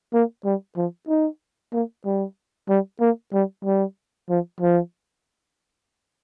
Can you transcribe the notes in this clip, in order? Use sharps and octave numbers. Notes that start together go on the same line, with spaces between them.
A#3
G3
F3
D#4
A#3
G3
G3
A#3
G3
G3
F3
F3